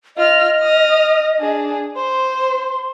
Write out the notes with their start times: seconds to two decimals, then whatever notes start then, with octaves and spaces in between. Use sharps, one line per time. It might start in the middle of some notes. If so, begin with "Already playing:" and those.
0.17 F4 D#5 F6
0.59 D#6 F6
1.39 D4 G#4
1.96 C5 C6